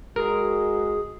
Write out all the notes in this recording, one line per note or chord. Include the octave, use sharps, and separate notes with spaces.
G#3 F#4 G#4 A#4